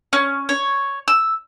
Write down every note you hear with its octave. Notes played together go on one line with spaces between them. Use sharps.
C#4
C#5
E6